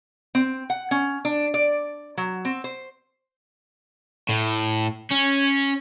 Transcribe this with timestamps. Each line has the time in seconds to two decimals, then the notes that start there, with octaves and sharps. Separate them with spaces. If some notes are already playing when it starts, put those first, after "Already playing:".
0.35 C4
0.70 F#5
0.91 C#4
1.25 D4
1.54 D5
2.17 F#3
2.45 C4
2.64 C5
4.29 A2
5.11 C#4